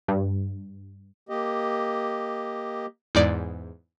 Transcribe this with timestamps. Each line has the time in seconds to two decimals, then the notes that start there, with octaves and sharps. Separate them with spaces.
0.08 G2
1.29 A#3 G4 D#5
3.15 E2 G#2 D5